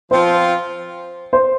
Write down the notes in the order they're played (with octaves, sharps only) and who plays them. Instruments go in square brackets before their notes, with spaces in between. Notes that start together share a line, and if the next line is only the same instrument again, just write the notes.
[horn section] F3 C4 F4 [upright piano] C5
[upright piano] C5